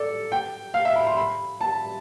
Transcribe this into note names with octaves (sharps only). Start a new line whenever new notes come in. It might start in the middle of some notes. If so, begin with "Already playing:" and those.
Already playing: A4 D5
G5
F5
E5
B5
C6
B5
A5